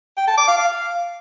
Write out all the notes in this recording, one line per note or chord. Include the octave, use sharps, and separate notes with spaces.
G5
A5
D6
F5
F5